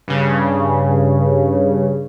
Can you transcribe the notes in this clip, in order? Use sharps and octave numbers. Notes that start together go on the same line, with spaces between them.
G2 C#3